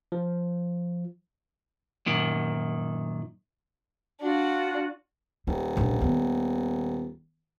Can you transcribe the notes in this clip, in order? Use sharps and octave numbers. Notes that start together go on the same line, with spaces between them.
F3
F#2 A#2 D#3
D4 F4 F#4 F#5
D#1 G3
A#1
D#3 B3